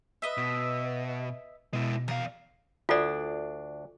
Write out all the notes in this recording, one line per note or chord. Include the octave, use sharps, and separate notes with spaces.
B4 D#5 E5
B2
B2 G#3 E4
E2 A#4 F5
D2 D4 F4 A4 D5